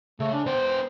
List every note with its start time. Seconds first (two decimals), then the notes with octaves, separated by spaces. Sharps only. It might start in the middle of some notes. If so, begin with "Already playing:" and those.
0.20 C#3 A3
0.33 D4
0.46 B3 C5 G5